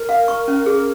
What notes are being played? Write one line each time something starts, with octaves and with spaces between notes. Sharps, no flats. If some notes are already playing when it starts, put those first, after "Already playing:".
Already playing: A#4
F5
C#6
C#4
G#4